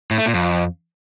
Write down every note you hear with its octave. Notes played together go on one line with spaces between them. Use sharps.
A2
A3
A#2
F2